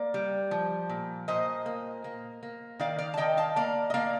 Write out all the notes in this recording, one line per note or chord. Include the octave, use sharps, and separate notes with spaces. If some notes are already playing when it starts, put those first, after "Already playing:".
Already playing: A#3 D5
G3
F3
A#2
A#2 C5 D#5
A#3
A#3
A#3
D#3 D5 F5
D5 F5
A5
D#3 D#5 G5
F5 A5
A#3 D5 F5
D#5
A#3 D5 F5